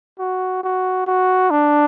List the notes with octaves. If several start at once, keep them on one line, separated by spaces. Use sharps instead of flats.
F#4
F#4
F#4
D4